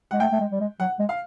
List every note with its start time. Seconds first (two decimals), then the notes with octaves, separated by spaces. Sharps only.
0.11 G#3 F#5
0.20 A3 G5
0.32 A3
0.40 G#3
0.51 G3
0.60 G#3
0.80 F#3 F#5
0.99 G#3
1.09 F5